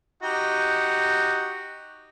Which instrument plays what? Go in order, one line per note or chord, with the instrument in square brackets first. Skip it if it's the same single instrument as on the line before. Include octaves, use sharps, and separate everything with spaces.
[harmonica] D#4 F#4 G4